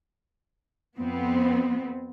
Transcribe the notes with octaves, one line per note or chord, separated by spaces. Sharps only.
F2 B3 C4